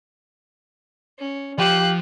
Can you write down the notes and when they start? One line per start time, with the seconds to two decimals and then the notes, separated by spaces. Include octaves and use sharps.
1.19 C#4
1.58 F3 G4 F5 F#6